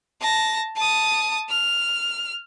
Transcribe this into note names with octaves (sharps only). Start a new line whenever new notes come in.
A5 A#6
A5 D#6
F6